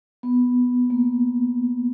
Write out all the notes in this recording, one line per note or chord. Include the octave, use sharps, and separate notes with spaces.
B3
A#3